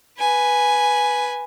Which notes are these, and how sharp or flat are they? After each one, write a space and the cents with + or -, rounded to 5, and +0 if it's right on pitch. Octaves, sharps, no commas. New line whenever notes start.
B4 -5 G#5 +0